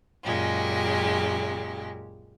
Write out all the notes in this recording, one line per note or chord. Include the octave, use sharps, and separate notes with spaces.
F#2 A#2 C#3 G#3 G4